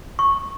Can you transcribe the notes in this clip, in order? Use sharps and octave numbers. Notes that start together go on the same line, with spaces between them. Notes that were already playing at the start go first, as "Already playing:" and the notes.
C#6